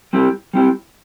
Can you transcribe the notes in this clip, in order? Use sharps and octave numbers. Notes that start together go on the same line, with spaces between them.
G3 C4 E4 G4
G3 C4 E4 G4